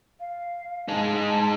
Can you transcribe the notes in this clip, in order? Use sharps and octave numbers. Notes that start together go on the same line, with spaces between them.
F5
G#3 D#4 A5